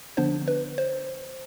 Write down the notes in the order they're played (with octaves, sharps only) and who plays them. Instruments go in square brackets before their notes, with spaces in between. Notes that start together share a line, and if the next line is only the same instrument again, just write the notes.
[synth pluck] D3 F3 B3 D4 C5
B4
C5